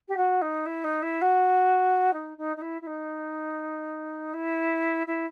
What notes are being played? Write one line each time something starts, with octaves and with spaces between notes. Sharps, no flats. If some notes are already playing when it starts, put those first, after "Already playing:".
G4
F#4
D#4
E4
D#4
E4
F#4
D#4
D#4
D#4
E4
E4
D#4
E4
E4